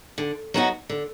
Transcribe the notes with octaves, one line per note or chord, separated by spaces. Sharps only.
D3
F#3 B3 D#4 F#4
D3